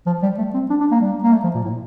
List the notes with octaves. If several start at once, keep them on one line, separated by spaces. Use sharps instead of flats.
F3
G3
A3
C4
D4
D4
A#3
G3
A#3
A3
F3
A#2
A2